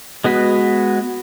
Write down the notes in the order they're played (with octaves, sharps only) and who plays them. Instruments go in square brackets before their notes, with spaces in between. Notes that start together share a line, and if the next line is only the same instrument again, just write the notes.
[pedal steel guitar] G#3 B3 F#4 B4